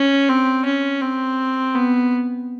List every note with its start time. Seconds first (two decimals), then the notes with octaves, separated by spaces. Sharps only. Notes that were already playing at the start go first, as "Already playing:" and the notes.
Already playing: C#4
0.29 C4
0.65 C#4
1.01 C4
1.75 B3